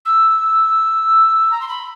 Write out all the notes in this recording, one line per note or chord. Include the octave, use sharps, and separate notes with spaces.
E6
A#5
C6
B5